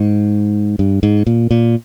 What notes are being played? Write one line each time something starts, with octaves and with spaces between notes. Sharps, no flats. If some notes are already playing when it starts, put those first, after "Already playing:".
Already playing: G#2
G2
G#2
A#2
A#2